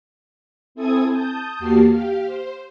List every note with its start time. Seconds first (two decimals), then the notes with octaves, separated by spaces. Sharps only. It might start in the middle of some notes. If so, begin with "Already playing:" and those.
0.75 C4 E4 A4 G#5 D#6 G#6
1.09 A5 D#6 G6
1.59 E2 A#3 F#4 G4 A5 C7
1.88 G4 F5
2.25 C5